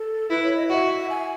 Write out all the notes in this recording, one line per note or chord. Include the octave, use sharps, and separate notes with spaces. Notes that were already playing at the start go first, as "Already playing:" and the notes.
Already playing: A4
E4 B4
C#5
D#5
F#4 E5
G#5